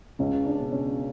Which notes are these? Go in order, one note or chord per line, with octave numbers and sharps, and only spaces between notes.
C#2 C#4
D4
B2
C#4